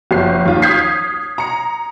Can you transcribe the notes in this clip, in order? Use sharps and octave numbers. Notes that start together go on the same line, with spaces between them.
F#1 F3 C7
D#2 F4
D#6 F6 G6 G#6 B6 C7
A#5 C#7